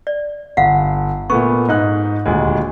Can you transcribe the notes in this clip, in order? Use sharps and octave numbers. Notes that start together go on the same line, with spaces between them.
D5
G1 F5 F#5
A#2 A3 B3 C#6
G#2 D#4 F#6
D#1 D2 G#3